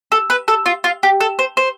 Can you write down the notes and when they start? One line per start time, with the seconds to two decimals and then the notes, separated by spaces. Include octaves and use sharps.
0.12 A4
0.30 B4
0.48 A4
0.66 F4
0.84 F4
1.03 G4
1.21 A4
1.39 C5
1.57 C5